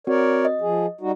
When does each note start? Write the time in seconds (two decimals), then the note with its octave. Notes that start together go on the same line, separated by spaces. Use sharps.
0.07 C4 F#4 A#4 C#5 D5
0.45 D#5
0.61 F3 G#4
1.01 G3 D#4 F#4